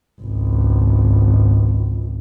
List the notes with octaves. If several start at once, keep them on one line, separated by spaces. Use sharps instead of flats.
G#1 C#2